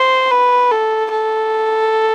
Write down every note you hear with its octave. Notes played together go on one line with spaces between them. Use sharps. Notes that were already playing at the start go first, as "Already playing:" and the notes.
Already playing: C5
B4
A4
A4